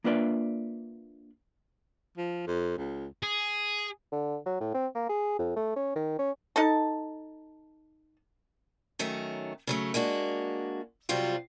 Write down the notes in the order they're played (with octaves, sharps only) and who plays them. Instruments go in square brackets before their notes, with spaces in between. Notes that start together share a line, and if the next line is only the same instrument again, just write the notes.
[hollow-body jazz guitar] A#3 D4 F4 B4 D5 E5
[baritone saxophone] F3
F2
C#2
[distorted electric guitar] G#4
[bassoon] D3
F#3
A2
C4
A#3
G#4
F2
A3
C#4
D#3
C#4
[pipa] D#4 A4 A5
[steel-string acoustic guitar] D#3 F#3 A3 C#4
C#3 F#3 A3
G#3 A#3 D4 F#4
C3 F#3 G3 C4 F4 F#4